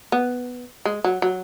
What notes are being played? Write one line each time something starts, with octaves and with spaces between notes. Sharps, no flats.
B3
G#3
F#3
F#3